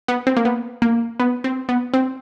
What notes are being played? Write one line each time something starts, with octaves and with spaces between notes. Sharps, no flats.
B3
C4
A#3
B3
A#3
B3
C4
B3
C4